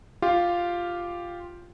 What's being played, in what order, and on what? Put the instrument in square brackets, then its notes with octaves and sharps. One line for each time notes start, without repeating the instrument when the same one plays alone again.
[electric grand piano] F4 G4 F5